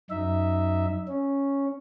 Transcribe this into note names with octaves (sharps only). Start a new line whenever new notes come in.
F#2 D#4 E5
C#4